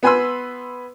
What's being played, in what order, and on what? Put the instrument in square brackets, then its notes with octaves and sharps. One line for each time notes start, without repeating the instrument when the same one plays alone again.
[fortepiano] B3 B4 G#5 B5 C6 E6